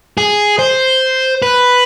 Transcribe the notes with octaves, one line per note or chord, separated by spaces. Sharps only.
G#4
C5
B4